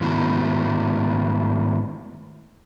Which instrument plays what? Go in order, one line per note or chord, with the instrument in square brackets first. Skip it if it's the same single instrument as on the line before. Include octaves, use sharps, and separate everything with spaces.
[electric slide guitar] G#2 D#3 A3 B3 E4 F#4